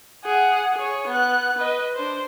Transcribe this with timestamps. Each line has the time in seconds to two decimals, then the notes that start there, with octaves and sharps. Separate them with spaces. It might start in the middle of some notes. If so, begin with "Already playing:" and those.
0.24 G#4 F#5
0.75 G#4 C#5
1.07 B3 F#6
1.58 B4 D#5
1.95 D4 C5